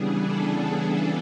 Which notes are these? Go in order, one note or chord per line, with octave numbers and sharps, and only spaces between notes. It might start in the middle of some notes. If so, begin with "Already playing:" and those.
Already playing: C#3 E3 G3 B3 D4 G#4
A4
G#4
G#4